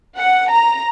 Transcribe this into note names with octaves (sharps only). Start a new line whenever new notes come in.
F#5
A#5